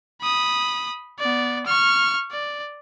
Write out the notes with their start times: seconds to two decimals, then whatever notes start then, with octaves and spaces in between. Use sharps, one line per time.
0.22 B5 D#6
1.19 B3 D5
1.66 C#6 F6
2.32 D5